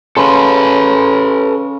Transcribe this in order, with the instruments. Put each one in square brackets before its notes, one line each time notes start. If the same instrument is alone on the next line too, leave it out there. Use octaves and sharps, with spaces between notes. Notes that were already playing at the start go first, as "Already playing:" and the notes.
[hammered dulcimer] C#3 C6 [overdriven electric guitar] A4 B4